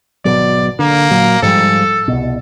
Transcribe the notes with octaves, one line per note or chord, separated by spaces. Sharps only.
G#1 B2 F#3 D5
D3 A#3
A#2 F#3
G#2 F3 G3 A4
C2 B2